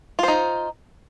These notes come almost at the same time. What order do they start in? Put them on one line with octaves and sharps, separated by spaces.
F4 C5 D#4